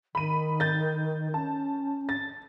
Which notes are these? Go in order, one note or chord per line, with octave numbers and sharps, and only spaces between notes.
D#3 B5 D#7
G6 A6
C#4 A5
A6